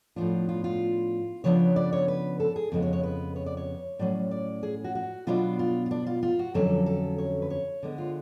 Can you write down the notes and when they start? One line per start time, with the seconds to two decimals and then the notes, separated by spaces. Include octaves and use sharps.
0.16 A2 F3 B3 D4 F4
0.49 F4
0.64 F4
1.44 C#3 F3 B3 D4 C#5
1.76 D5
1.93 C#5
2.08 B4
2.40 A4
2.56 G#4
2.72 F2 C#3 G#3 B3 A4
2.82 C#5
2.93 C#5
3.03 B4
3.36 C#5
3.46 D5
3.57 C#5
3.99 A2 F#3 C#4 D5
4.31 D5
4.63 G#4
4.84 F#4
4.95 F#4
5.27 B2 F#3 B3 D4 F4
5.59 F4
5.86 F4
5.91 D4
6.06 F4
6.23 F4
6.39 F#4
6.54 F2 D3 F#3 C#4 A4
6.86 A4
7.18 C#5
7.42 B4
7.50 C#5
7.83 D3 G#3 B3
7.98 F4